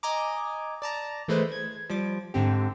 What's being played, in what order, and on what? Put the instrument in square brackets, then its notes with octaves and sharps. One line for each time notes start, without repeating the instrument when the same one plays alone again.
[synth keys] D#5 G#5 A#5 D6
D5 A5 A#5
E3 G#3 A3 B4 C5
G#6
F3 G3 D6
G#2 D3 C4 G4